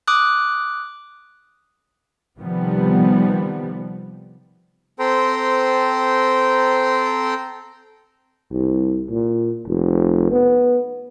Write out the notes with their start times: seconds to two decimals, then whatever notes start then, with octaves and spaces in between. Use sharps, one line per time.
0.08 D6 D#6 F#6
2.38 C3 D#3 F3 G3 B3
5.00 C4 A4 C5 G5 A#5 C6
8.52 C2
9.10 A#2
9.68 F1
10.31 B3